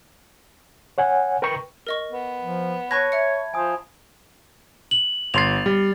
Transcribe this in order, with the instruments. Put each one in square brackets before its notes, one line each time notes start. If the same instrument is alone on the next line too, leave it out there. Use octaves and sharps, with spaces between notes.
[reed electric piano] C#5 F#5 G#5
A#4 B4 G5 A#5 C#6
[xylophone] A#4 D#5 C#6
[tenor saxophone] B3
[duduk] F3
[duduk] C#5 [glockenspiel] A5 B5 G#6 [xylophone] C#6 F#6 A#6
[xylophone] E5 C#7
[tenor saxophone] F3 [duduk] C5 [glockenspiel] G#5 D#6
[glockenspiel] F#7
[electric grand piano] G1 C6 C7 [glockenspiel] A6 F7
[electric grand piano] G3